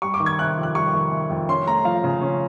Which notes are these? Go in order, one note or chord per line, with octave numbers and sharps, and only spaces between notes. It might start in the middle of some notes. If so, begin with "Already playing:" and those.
G3 C#6
D6
D#3
G#6
C3 F#6
F2
F#6
G3 C#6
D#3
C3
F2
C#4 C6
A3 A#5
F3 F5
C#3
C#4